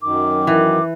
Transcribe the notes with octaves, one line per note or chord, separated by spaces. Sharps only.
F#2 D#3 D6
E3